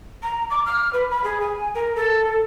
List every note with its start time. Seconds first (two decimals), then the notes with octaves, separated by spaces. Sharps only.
0.23 A#5
0.50 D6
0.66 F6
0.93 B4
1.11 B5
1.24 G#4
1.40 G#5
1.75 A#4
1.96 A4